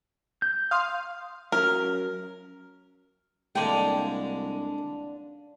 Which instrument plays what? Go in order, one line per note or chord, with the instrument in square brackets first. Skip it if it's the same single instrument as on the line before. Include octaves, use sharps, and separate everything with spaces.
[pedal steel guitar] G6
[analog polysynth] F5 [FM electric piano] C6 D#6 F6
[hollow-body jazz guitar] F#3 C#4 [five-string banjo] A#4
[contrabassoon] C2 [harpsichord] D3 G#3 [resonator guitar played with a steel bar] A#3 G5 [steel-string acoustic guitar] D4